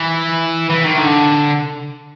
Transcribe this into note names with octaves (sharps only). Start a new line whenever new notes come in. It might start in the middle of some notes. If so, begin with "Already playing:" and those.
Already playing: E3
E3
D#3
D3